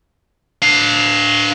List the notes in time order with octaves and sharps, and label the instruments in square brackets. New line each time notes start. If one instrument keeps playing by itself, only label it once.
[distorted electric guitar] D4 F5